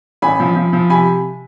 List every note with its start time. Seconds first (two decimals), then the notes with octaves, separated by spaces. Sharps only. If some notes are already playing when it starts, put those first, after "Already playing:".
0.22 A1 G#5 B5
0.40 F3
0.56 F3
0.73 F3
0.90 C3 G#5 B5